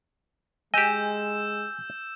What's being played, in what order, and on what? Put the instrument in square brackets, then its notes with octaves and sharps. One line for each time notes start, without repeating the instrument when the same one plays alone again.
[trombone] G#3 [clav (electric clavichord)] G4 D#5 [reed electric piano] G#5 [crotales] E6 G6 E7